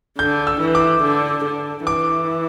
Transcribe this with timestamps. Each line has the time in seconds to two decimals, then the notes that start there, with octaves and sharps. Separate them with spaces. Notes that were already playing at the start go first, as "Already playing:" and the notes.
0.19 D3 G6
0.47 E6
0.60 E3
0.75 D6
1.03 D3
1.45 D3
1.87 E3 D6